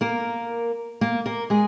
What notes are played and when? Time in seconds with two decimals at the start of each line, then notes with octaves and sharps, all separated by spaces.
0.01 A#3 A#4
1.01 A#3 A#4
1.26 A#3 A#4
1.50 G#3 G#4